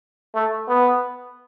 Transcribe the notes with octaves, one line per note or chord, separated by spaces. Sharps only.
A3
B3